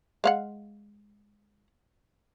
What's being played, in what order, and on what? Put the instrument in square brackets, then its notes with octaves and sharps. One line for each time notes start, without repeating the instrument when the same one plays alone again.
[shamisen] G#3 F5 F#5